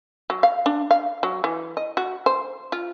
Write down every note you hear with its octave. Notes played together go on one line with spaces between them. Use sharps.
F#3
F5
D4
F5
F#3
E3
D#5
F#4
C5
F4